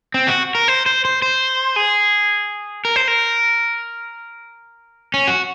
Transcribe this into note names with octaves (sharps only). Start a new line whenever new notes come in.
C4
F#4
A#4
C5
C5
C5
C5
G#4
A#4
C5
A#4
C#4
F#4